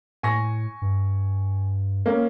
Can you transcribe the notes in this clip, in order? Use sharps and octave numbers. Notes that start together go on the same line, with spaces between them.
A2 G#5 C#6 A#6
G2
A#3 C#4